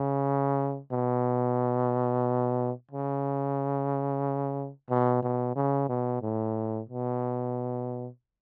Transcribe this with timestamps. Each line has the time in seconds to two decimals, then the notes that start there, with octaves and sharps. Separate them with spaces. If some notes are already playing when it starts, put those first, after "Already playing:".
Already playing: C#3
0.92 B2
2.91 C#3
4.90 B2
5.23 B2
5.56 C#3
5.89 B2
6.22 A2
6.89 B2